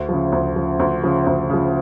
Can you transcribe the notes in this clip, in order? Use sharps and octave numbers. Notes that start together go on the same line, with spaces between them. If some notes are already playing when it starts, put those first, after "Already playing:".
Already playing: D2
C#3 F3
D2
C#3 F3
D2
C#3 F3
D2
C#3 F3